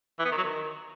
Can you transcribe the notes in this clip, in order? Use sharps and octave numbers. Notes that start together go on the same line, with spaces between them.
E3
B3
D#3
F#3
D#3